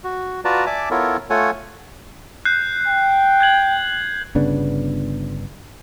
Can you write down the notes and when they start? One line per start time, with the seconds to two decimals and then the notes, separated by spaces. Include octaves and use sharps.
0.04 F#4
0.45 F4 F#4 B4 D5 A5 A#5
0.66 D5 E5 G#5 A5 D6
0.91 B3 E4 F4 A4 A#4 C#5
1.30 A3 F4 A4 C#5 F#5 G#5
2.45 F#6 G6 C7
2.88 G5
3.41 G6 G#6 F#7
4.35 G1 C#3 B3 D4